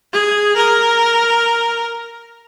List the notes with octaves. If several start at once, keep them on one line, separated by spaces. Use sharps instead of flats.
G#4
A#4